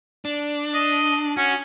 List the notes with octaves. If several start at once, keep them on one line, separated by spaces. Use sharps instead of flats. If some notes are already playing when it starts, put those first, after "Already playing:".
D4
D#5
C#4 F#4